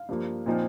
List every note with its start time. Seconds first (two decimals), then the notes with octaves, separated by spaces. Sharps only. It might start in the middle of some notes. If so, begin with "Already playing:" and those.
Already playing: F5
0.09 G2 F3 A#3
0.46 A#2 F3 C4 D#4